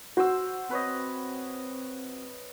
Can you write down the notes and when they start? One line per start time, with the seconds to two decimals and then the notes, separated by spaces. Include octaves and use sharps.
0.17 F#4 C5 E6
0.70 C4 B4 C#5 D#5